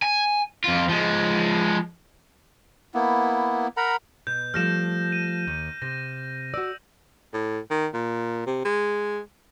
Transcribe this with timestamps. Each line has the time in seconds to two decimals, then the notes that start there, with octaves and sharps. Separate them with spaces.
0.02 G#5
0.64 F2 F4
0.89 F3 G#3
2.94 A#3 B3 E4
3.77 A#4 F#5 A#5 B5
4.27 B2 G6
4.54 F3 G3 A3 F6 A#6 E7
5.12 D#7
5.47 D#2
5.82 C3 A#6
6.54 F#4 D5 E6
7.33 A2
7.70 D#3
7.94 A#2
8.46 C3
8.65 G#3